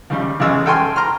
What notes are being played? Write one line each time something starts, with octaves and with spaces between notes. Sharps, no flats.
D#2 C#3 G3
A1 E2 C#3 G#3 E6
A4 G5 G#5 C6 F6
A#5 C6 F6